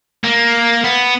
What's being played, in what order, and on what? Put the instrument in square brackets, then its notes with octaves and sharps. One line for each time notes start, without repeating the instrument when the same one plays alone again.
[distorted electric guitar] A#3
B3